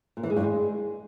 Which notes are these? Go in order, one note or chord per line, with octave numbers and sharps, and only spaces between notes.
A#2
E3
G#3
G2
G#3